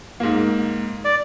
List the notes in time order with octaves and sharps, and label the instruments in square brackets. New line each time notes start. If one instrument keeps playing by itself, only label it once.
[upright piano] G#2 A#3
[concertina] D5